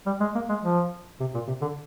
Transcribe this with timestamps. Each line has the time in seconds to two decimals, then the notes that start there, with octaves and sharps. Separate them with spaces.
0.06 G3
0.20 G#3
0.35 A#3
0.49 G#3
0.63 F3
1.20 C3
1.34 A#2
1.47 C3
1.62 D3